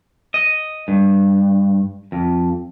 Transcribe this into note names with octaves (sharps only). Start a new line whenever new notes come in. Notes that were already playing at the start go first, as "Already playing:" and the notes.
D#5
G2
F2